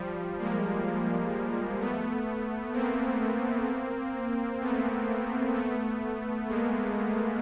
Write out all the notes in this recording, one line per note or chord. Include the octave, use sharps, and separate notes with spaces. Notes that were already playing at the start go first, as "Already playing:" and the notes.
Already playing: F3 G3
G#3 A#3
A3 B3
A#3 C4
A3 B3
A3 B3
G#3 A#3